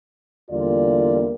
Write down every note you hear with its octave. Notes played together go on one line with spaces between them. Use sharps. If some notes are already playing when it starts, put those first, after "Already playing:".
E2 D3 G3 A#3 F4 D5